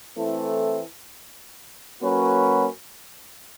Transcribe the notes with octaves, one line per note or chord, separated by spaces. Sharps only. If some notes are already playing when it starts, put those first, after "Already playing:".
E3 A3 C4 E4 A4
F#3 A#3 C#4 F#4 B4